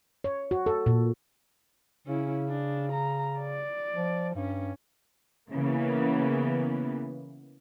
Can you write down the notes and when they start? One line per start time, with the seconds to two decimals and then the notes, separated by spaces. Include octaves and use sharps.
0.24 C#5
0.51 F#4
0.66 A4
0.86 A#2
2.07 C#3 C#4 E4
2.48 D4
2.92 A#5
3.38 D5
3.94 F3
4.35 G2 C#4
5.52 C#3 E3 A#3 B3